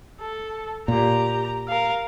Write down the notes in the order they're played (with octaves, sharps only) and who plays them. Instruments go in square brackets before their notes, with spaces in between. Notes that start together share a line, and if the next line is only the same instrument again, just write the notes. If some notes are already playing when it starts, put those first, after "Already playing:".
[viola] A4
[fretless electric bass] A#2 [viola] G4 A#5
[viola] A#4 F5